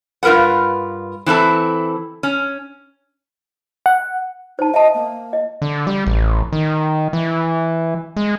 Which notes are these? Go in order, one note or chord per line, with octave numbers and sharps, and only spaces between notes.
G2 F4 A#4 B4 F#5
E3 C4 E4 A4
C#4
F#5
D#4 C5 A5
D#5 E5 A5
A#3
D#5
D3
G3
A1
D#3
E3
G#3